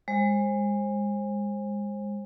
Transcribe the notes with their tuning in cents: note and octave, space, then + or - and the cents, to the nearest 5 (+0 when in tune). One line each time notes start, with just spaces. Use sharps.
G#3 -25 C5 +30